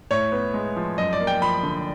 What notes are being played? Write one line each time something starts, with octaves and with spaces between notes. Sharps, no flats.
A2 C#5
B3
G#3
F3
F#2 D#5
D5
A#3
G5
F3 B5
D3